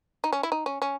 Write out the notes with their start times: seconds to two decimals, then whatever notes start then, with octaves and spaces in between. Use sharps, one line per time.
0.24 D#4
0.33 C#4
0.43 E4
0.52 D#4
0.66 C#4
0.82 C#4